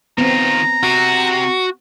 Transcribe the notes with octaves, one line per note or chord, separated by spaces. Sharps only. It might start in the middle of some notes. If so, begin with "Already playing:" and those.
D#3 B3 C4 F4 A#5
C3 F#4